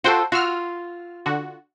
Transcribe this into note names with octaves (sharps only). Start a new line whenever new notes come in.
F4 F#4 A4 C5 G5
F4 F#4 E6 F6
D3 F#4